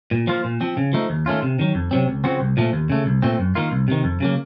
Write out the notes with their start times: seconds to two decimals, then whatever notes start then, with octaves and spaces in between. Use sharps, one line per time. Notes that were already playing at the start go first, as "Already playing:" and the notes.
0.11 A#2
0.27 F3 A#3 F4
0.44 A#2
0.61 F3 C4
0.77 C#3
0.93 F3 A3 D#4
1.10 D#2
1.26 D#3 A3 C#4 F4
1.42 C3
1.59 D#3 F#3
1.75 F2
1.91 C3 F#3 C4
2.08 C#2
2.24 C#3 F3 C4 F#4
2.40 C2
2.57 A#2 F3 A3
2.73 D#2
2.90 C#3 A3
3.06 C2
3.22 A#2 A3 C4
3.38 F#2
3.55 D#3 A#3 F4
3.71 C2
3.88 C3 D#3
4.04 F2
4.20 C#3 F#3 A#3